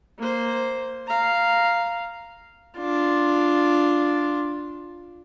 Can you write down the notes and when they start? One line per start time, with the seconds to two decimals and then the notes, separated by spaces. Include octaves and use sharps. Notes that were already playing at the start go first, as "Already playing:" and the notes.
0.19 A#3 C5
1.07 F5 A#5
2.78 D4 F4